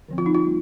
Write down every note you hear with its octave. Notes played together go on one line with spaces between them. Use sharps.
D3 F3 C4
F4
D#4
F4
G3 A#3